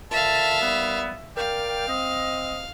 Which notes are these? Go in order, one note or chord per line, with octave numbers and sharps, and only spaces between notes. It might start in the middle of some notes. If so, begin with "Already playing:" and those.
A#2 D3 E5 F5 A5
D#2 G3 B3
A#4 D5 F5 G5
C4 D#5